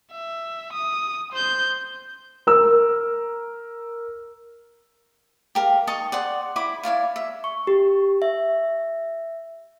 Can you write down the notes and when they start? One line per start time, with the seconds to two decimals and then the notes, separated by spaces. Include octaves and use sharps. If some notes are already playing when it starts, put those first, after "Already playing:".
0.12 E5
0.73 D#6
1.32 C5 G6
2.47 A#4 E6
5.55 G4 A#4 F5
5.87 D#4 D#5 A5 C#6
6.12 D5 F#5 C6
6.56 E4 B5 D6
6.83 E4 C#5 D5 F5
7.16 E5
7.44 C#6
7.67 G4
8.22 E5